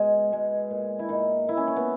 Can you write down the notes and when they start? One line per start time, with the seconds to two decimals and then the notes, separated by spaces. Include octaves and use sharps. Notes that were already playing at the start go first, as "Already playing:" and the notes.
Already playing: B2 G#3
0.32 B2 G#3
0.71 A#2
0.99 E4
1.09 A#2 D#4
1.48 A#2 E4
1.57 C#4
1.68 C#4
1.76 B3